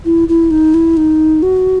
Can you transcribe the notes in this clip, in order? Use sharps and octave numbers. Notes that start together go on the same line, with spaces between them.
E4
E4
D#4
E4
D#4
F#4